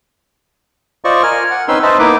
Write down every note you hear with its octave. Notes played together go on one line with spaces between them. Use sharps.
F4 C5 D5 D#5 C#6
A#4 G#5 F6
F#5
C4 C#4 D#4 B4 C6 E6
B4 C5 D#5 E5 A5
A#3 B3 D#4 E4 B4 D6